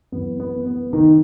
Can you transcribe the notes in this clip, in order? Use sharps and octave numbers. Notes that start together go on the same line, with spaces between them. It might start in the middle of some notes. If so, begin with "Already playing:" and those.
F#2 E3 B3
B3
B3
D#3 D#4